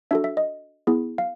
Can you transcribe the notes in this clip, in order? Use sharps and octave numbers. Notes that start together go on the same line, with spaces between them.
D4 F#4 A4 E5
E5
D#5
B3 E4 G#4
F5